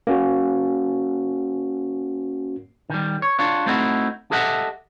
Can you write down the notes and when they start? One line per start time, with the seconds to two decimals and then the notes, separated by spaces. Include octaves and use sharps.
0.07 A#3 C#4 F#4
2.90 D#3 G3
3.22 C#5
3.39 D4 F4 C#5
3.66 A3 C4 D#4 E4 F#4
4.31 G4 A4 D#5 E5 F#5